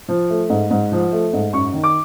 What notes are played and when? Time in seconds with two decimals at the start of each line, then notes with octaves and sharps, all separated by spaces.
0.09 F3
0.30 A3
0.50 G#2
0.70 G#2
0.92 F3
1.12 A3
1.33 G#2
1.53 F#2 C#6
1.73 D#3
1.83 D6